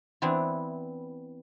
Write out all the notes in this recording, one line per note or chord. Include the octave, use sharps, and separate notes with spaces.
E3 B3 C4 D4 E4